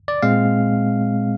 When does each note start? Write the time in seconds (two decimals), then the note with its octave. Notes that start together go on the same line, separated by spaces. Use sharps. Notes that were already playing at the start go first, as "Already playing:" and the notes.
0.08 D5
0.22 A#2 G#3 C4 F5